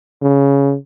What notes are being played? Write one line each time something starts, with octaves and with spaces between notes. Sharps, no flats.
C#3